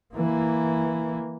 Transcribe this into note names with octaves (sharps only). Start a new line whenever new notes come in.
E3 A#3